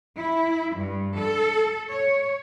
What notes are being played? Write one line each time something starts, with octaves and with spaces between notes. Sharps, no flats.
E4
G2
A4
C#5